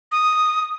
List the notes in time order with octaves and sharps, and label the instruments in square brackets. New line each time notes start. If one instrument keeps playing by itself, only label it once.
[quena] D#6